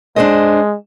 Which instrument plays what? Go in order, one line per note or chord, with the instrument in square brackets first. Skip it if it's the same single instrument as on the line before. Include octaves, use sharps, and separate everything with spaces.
[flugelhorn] G#3 [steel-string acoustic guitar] D4 C5 D#5